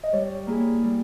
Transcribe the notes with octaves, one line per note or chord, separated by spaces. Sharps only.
D#5
G3 C#5
A#3 E4 G#4
G3